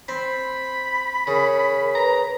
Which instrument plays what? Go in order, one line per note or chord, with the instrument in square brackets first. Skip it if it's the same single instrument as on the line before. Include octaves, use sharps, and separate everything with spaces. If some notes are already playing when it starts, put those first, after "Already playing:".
[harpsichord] C4 [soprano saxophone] B5
[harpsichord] C#3 [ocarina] A#4
[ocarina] B4 [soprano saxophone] A#5